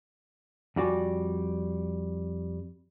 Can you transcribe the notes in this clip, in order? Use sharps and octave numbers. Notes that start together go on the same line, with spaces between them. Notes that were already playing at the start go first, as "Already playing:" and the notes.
F2 G3 F#4 D5 G#5